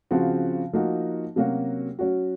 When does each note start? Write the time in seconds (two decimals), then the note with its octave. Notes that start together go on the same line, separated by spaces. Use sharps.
0.11 C#3 F3 C4 F#4
0.73 F3 A#3 D#4 F#4
1.36 C3 F#3 A#3 C#4 F#4
1.99 F#3 C#4 F#4